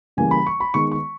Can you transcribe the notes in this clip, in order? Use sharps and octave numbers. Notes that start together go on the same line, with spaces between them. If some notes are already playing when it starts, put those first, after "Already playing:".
C#3 E3 G3 A#3 G#5
B5
C#6
B5
D#3 G#3 B3 C#6
C#6